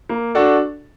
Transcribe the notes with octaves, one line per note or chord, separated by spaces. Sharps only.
A#3
D4 F#4 A4